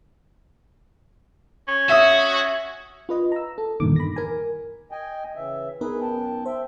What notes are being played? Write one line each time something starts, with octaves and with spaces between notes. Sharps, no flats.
C#4
F#4 E5 D#6
F4 B4 D#5
A#5 E6
A4
E2 G2 A#2 D3 D#3 D6
B5 A#6
A#4 G#5
D#5 G5 G#5
C#3 E3 E5
B3 D#4 G#4 A#4 B4
F#2 G5 A5
C5 E5 G5